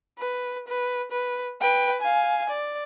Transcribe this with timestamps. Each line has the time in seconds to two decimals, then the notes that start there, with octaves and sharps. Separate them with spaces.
0.19 B4
0.68 B4
1.11 B4
1.62 B4 G5
2.01 F5 G#5
2.50 D5